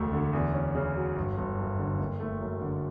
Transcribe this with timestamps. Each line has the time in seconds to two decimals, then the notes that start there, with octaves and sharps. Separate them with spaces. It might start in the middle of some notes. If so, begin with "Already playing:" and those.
Already playing: E1 D2 A3
0.13 D3
0.33 E2
0.54 C#4
0.75 C#3
0.95 F#3
1.16 G1
1.38 G1
1.58 F#2
1.79 D3
1.99 F#1
2.20 A3
2.41 F#2
2.61 D3